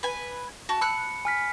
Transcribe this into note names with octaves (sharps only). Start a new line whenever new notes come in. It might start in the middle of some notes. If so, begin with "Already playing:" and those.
B4 G#5
F#4 A5
B5 E6 F#6 C#7
G#5 F6 B6